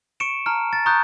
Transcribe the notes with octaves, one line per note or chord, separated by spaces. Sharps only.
C#6 C#7 D7 E7
A5 A#5 F6
A6
A#5 C#6 D#6 F#6 G6